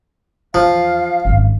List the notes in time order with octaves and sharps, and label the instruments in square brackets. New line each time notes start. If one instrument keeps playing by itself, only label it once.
[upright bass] E2 [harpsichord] F3 [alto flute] F5
[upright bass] G#1 F#2